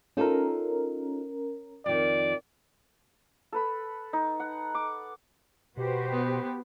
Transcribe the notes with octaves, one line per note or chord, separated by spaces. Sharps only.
C#4 D#4 F4 A4 A#4
F2 D#3 D5
A4 B4 B5
D#4
F#5
D6
B2 F#4 G4 B4 C5
B3